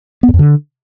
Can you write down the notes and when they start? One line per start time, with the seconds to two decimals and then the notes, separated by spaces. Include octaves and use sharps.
0.23 B3
0.28 F#2
0.34 F2
0.39 D3